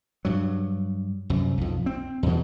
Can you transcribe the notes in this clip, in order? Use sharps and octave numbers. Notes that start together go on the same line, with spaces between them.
G2 F#3
C2 F#2
B1 F2
C4
E2 B2